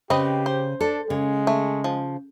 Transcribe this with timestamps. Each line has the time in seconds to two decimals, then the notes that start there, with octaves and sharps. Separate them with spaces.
0.10 C#3 C4 G4 B4 D#5
0.46 C5
0.81 D4 A4
1.10 C#3 G#3
1.47 A3
1.84 F3